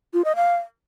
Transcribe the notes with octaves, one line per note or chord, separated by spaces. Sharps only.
F4
D#5
F5